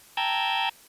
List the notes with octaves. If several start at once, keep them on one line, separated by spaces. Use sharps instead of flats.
G5 A5 A#5 E6 G6 G#6